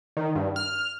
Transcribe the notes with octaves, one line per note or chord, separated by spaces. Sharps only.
D#3
G2
F6